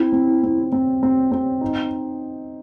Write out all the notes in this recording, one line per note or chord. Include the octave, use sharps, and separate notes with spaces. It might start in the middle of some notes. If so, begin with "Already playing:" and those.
Already playing: C4 E4
C4
C4
C4
C4
C4
D#4